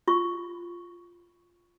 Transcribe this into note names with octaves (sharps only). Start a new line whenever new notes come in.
F4 C#6